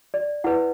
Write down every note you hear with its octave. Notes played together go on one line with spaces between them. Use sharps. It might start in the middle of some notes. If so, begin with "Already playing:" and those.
D5
E4 B4 F#5